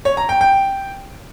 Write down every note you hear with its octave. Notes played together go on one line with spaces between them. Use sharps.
C#5
A#5
G5
G5